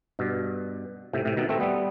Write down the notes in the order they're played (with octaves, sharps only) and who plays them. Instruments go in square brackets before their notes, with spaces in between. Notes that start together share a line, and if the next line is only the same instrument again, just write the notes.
[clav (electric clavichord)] G2 B2
A2 C3
A2 C3
B2 D#3
A3 C4
G3 B3